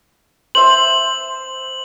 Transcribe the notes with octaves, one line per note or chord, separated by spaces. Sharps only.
C5 E5 F#7